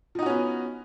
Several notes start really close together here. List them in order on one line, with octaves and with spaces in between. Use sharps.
F3 D#4 F#4 C#4 B3